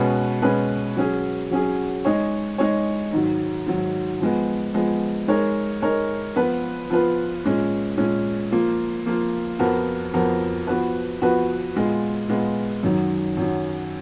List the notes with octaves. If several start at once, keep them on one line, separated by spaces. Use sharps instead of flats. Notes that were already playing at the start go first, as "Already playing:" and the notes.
Already playing: B2 G#3 C#4 G#4 B4
B2 G#3 C#4 G#4 B4
F#3 C#4 G#4
F#3 C#4 G#4
G#3 D#4 G#4 C#5
G#3 D#4 G#4 C#5
G#2 D#3 F#3
G#2 D#3 F#3
F3 G#3 B3
F3 G#3 B3
G#3 D#4 A#4 C#5
G#3 D#4 A#4 C#5
F3 B3 F4 B4
F3 B3 F4 B4
A#2 G#3 C#4
A#2 G#3 C#4
F3 A#3 F4
F3 A#3 F4
F2 F3 B3 F#4 A#4
F2 F3 B3 F#4 A#4
F3 B3 F#4 B4
F3 B3 F#4 B4
A#2 G#3 B3 F4
A#2 G#3 B3 F4
F#2 D#3 F#3
F#2 D#3 F#3